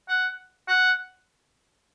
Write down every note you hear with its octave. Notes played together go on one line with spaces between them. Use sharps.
F#5
F#5